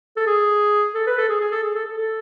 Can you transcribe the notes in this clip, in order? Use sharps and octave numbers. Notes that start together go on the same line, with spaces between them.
A4
G#4
A4
B4
A4
G#4
G#4
A4
G#4
A4
A4
A4